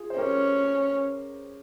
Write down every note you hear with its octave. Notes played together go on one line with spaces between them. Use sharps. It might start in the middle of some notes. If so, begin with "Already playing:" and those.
Already playing: F4 G#4
C5
C#4 G4 A#4